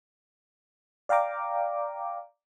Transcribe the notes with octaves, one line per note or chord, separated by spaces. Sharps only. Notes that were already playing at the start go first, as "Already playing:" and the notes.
D5 F5 G5 A#5 D6